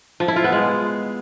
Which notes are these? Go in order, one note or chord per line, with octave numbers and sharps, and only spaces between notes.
F3
E4
F4
B3
G#3